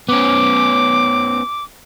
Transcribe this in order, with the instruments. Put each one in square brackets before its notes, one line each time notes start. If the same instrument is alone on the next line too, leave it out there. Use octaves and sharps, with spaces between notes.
[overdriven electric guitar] B3 C#4 [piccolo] D6